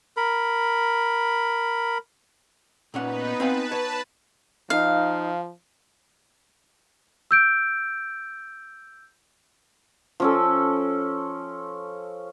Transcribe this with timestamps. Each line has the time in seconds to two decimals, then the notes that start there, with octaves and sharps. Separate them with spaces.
0.17 A#4 B5
2.94 A#2 B3 C#4 D#4 B4 F#5
3.40 C4 B4 F5 G#5 A5
3.72 C#5
4.70 F3 D#4 F5
7.31 E6 G6 D7
10.20 F3 C#4 A4